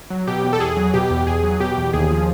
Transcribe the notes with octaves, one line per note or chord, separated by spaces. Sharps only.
F#3
B2 G4
E2
A4
E2 G#4
F#3
B2 G4
E2
E2 G#4
F#3
B2 G4
E2
D#2 G#4
F3